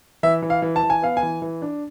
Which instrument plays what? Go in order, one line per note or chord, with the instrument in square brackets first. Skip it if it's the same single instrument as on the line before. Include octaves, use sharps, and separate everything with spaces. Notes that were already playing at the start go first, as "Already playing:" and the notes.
[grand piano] E3 E5
E3
F5
E3
A5
E3
G#5
B3 F5
G#5
E3
E3
D4